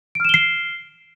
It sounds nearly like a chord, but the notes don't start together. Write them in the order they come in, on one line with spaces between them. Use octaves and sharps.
D7 F6 E7 G7 C7